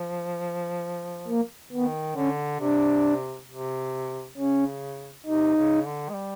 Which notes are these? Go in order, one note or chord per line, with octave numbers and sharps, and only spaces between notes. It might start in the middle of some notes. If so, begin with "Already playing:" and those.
Already playing: F3
A#3
D#3 B3
D3 C#4
C3 D4
C3
C#3 C#4
C3 D#4
C#3
D3
G#3
G3